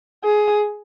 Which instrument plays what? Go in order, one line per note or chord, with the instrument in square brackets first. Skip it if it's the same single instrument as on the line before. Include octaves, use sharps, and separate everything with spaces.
[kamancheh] G#4